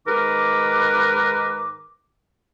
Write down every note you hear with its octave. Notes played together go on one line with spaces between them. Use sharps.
G#2 D#3 A#4 B4 D6